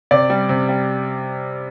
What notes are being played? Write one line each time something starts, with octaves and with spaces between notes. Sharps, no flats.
C3 D5
G3
C3
G3